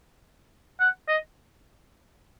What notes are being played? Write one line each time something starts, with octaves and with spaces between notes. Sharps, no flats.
F#5
D#5